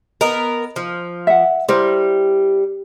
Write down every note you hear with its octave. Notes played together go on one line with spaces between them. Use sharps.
B3 A#4 D#5
F3
E5 F#5
G3 E4 A#4 C5